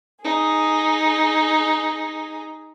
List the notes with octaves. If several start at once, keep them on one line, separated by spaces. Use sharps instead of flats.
D#4 G#4